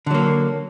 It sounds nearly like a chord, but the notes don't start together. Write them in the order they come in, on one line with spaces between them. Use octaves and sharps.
D3 F#3 A#3